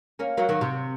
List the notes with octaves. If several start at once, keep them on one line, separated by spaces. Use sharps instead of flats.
A#3 C#4
F#3 A#3
D#3 F#3
C3